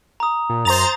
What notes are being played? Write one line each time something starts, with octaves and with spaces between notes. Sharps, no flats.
A#5 D#6
A#2
F#2 C5 A#5 A6 F7